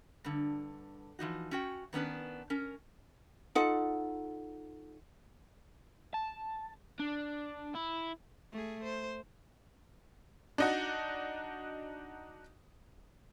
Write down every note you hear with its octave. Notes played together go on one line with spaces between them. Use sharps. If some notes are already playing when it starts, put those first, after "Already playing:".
G2 D3
E3 F3 D#4 F#4
C#4 F#4 G5
D#3 B3 C#4 D4 B4
C#4 A#4
D#4 F4 A4 F#5
A5
D4
E4
A3 G#4
C5
D4 D#4 F#4